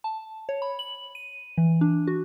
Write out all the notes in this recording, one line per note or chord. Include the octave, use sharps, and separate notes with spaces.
A5
C#5
B5
F#7
D#7
E3
D4
F#4